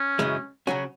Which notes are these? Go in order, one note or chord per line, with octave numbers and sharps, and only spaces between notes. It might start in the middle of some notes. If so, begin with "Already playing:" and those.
Already playing: C#4
F#2 C#3 E3 G#3
C#3 F#3 C#4 F#4